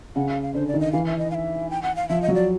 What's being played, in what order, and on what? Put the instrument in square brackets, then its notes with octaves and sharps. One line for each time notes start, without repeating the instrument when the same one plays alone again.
[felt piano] C#3 [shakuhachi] F#5
[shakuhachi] F5
F5
[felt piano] D3 [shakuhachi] C5
[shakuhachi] D5
[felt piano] D#3
[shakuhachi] D#5
[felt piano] E3 [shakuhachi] F5
[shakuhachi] E5
D#5
F5
E5
G5
F#5
F5
[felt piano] F3 [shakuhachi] E5
[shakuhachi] D#5
[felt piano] F#3
[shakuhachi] D5